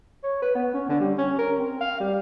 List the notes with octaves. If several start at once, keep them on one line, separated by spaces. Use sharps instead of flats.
C#5
B4
B3
C#4
D3
G3
C#4
A#4
C4
F5
G3